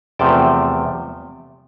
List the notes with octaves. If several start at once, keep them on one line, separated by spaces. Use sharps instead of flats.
E2 C3 F3 A3 G5 A5